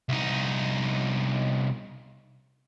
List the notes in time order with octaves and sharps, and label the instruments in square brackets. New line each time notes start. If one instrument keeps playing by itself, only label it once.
[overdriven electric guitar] C2 D#4